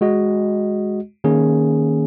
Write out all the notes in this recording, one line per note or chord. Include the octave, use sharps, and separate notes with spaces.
G#3 F#4 D#5
D#3 A#3 C#4 G#4